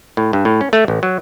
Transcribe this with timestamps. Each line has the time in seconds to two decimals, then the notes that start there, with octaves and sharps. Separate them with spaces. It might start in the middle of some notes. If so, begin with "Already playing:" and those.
0.17 A2
0.33 G2
0.45 A2
0.61 C#4
0.73 A3
0.88 A1
1.03 F#3